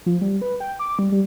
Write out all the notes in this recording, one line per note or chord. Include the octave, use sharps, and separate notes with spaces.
F3
G3
B4
G5
D6
G3
G3